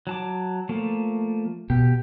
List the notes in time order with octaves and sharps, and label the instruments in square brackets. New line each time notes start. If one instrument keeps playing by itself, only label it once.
[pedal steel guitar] F#3 A5 D6
F3 A3 A#3
[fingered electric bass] B2 [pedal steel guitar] G4